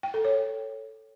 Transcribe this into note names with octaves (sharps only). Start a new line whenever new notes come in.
G5
A4
C#5